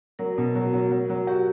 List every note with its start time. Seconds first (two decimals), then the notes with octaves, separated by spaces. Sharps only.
0.19 F#3 A#4
0.38 B2
0.55 F#3
0.73 F#3
0.91 F#3
1.10 F#3
1.27 F#4 G4